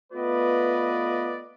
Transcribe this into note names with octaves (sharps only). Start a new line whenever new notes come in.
A3 B3 F4 B4 D5 D#5